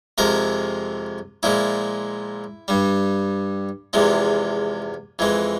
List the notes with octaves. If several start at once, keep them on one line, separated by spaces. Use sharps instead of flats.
F2 C3 F3 G#3 A#4
A#2 F3 G#3 E4
G2 G3
E2 C3 F3 G#3
F2 E3 G#3